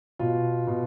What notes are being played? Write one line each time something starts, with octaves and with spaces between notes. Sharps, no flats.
B2 F4
B2